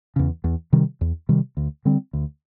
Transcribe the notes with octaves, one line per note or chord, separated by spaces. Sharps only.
E2 C#3
E2
C3 D#3 G3
E2
C3 D#3 G3
D2
D3 G3 C4
D2